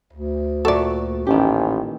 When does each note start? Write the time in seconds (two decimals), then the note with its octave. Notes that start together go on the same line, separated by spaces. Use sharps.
0.13 D2
0.65 A#2 A3 F#4 A4 D5
1.27 A1 D#3 C#4 G4